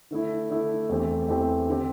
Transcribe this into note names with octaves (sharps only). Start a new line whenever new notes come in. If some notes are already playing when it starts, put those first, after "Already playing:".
D3 A3 E4
D3 A3 E4
E2 E3 A3 C4 G4
E2 E3 A3 C4 G4
D3 C4 G4